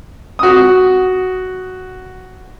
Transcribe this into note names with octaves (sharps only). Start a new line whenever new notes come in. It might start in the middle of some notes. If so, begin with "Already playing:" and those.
F#4 D#6